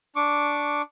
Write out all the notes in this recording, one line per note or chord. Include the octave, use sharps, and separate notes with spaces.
D4 C#6 D6